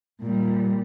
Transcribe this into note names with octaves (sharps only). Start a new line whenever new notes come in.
A#2 G3